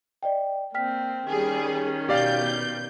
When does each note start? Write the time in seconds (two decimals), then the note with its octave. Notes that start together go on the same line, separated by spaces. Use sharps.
0.23 D5 D#5 G5
0.74 A#3 C4 G5 F6 B6
1.28 D#3 G3 C#4 G#4
2.09 B2 G4 D5 F5 G6